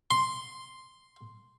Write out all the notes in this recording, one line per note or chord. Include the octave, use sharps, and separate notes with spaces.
C6